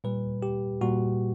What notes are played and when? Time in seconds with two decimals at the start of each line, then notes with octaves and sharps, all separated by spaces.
0.04 A#2 G3 B4
0.43 G4
0.81 A#2 G3 F#4